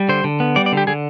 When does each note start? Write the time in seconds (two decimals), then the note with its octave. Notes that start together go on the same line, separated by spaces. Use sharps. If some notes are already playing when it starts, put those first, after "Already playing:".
Already playing: G3
0.09 D3 C5
0.24 D3
0.40 B3
0.56 G3 D5
0.66 D5
0.72 D3
0.77 G4
0.87 D3 G#4